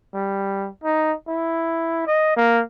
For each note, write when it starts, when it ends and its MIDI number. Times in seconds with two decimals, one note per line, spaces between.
0.14 0.68 55
0.84 1.14 63
1.28 2.04 64
2.06 2.34 75
2.36 2.62 58